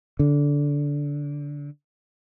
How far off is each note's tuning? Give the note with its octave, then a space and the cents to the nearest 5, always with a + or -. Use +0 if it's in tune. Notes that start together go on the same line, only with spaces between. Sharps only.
D3 -20